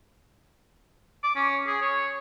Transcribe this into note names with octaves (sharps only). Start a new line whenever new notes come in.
D6
C#4
G#4
C#5